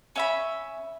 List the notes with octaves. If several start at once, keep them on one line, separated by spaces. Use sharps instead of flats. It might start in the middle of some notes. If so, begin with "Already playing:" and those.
C#4 E5 B5